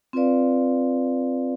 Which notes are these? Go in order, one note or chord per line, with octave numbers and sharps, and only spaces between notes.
C4 F4 B4 D5 F5